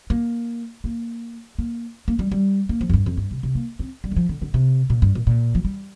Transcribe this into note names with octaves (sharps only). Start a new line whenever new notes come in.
A#3
A#3
A#3
A#3
G3
G3
A#3
F3
F2
G2
F2
G2
C3
C3
A#3
C4
G3
D3
F3
D3
D3
C3
A#2
G2
A#2
A#2
F3
G3